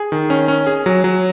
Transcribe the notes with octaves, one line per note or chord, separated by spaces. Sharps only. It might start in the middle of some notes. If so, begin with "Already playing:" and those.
Already playing: G#4
D#3
C#4
C#4
G#4
F#3
F#3